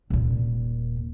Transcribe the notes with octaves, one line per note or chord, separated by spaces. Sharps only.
D#1 A#2